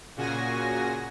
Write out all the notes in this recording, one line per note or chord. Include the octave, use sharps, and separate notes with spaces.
A#2 C#3 F#4 G#5 A#6